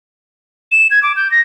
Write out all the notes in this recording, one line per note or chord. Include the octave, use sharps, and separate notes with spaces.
E7
G#6
D6
G6
A#6